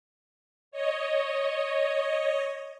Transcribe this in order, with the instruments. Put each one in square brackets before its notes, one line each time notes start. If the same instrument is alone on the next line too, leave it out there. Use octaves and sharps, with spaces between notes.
[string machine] C#5 D#5